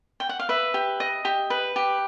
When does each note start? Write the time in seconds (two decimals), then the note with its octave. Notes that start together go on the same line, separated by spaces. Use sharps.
0.20 G5
0.29 F#5
0.39 F5
0.49 B4 E5
0.74 G4
1.00 D#5
1.25 G4
1.50 B4
1.76 G4